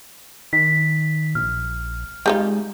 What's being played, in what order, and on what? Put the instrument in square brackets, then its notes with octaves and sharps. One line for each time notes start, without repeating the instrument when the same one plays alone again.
[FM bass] D#3 [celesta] B6
[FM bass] A#1 [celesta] F6
[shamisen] G3 D#4 F4 [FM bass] G#3